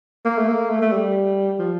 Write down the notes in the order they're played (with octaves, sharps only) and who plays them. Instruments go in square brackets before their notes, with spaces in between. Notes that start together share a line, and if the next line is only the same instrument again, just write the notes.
[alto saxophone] A#3
A3
A#3
A3
A3
G3
F3